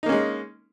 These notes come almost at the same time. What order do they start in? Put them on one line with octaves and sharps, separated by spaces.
D#4 A#3 C#4 G#3